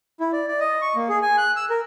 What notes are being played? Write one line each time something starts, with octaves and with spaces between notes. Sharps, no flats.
E4
D5
D5
D#5
C#6
A#3
G#4
G#5
F#6
E6
A#4